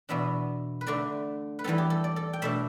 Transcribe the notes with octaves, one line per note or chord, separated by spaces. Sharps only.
E2 B2 B3 D4 E5
B4
D3 A3 D4 D5
B4
E2 E3 G3 B3 A4
G4
A4
D5
A4
G5
B2 A3 D4 E5